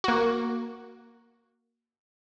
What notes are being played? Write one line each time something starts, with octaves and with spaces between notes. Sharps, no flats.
A#3 F#4